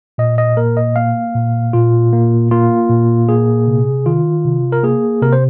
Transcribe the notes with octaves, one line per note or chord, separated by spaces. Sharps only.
A#2 D#5
D#5
A#3 A#4
D#5
A#3 F5
A#2
A#2 F4
A#3
A#3 F4
A#2
A#3 G#4
C3
D#3 F4
C3
A#4
A#3 G#4
C3 A#4
C5